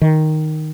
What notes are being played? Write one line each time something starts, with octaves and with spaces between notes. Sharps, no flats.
D#3